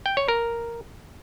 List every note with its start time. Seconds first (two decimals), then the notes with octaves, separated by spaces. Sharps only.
0.06 G5
0.17 C#5
0.28 A#4